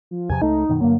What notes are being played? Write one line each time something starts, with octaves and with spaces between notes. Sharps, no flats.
F3
E2 C3 F3 G#5
C#2 A3 D#4
F#2 B2 D#3
G2 D3 F#3 A#3